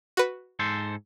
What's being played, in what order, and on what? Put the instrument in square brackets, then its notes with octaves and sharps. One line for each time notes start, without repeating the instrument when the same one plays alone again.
[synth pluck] F#4 B4
[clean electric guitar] G#2 A4 C5